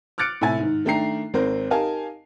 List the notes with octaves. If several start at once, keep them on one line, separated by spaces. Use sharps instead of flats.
D6 F6 F#6 A6 C#7 D7
A2 C3 E5 G#5 A6
G#2 D#3
D#3 A3 D4 G5 A#5 C7
G#1 C4 A#4 C5
D#4 G4 A#4 F5 G#5 A5